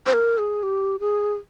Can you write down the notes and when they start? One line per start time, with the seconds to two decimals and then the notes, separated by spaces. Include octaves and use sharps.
0.06 C5
0.13 A#4
0.38 G#4
0.63 G4
1.00 G#4